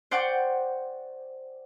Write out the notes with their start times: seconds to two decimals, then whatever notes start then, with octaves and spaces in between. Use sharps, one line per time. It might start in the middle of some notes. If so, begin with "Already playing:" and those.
0.11 C5 D5 F#5 G5 C#6 D6